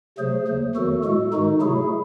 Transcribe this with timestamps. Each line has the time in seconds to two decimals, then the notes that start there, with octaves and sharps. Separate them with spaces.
0.18 C3 F#3 A3 G#4 C5
0.47 D#2 C#3 F#3
0.75 E2 D#3 F#3 A3 F#4 A4
1.04 A2 G#3 F#4 A4
1.33 G#2 D#3 G#3 D#4 F#4
1.61 C3 F#3 A3 E4 G#4